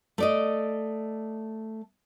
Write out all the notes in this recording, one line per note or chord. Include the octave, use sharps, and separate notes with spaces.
A3 D5 D#5